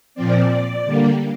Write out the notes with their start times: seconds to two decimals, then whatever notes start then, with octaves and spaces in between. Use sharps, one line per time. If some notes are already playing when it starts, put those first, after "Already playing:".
0.15 A#2 F3 C4 D5
0.85 D3 G3 A#3